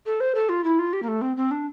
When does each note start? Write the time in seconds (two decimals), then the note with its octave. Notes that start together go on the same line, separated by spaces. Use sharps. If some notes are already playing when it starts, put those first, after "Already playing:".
0.06 A4
0.20 C5
0.35 A4
0.49 F4
0.64 E4
0.79 F4
0.93 G4
1.03 A#3
1.08 A3
1.21 C4
1.37 C4
1.51 D4